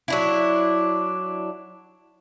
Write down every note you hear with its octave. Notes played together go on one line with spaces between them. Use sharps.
F#3 D4 E4